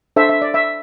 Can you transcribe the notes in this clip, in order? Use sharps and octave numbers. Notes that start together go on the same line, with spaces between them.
D4 A4 C5 E5
E5
D5
E5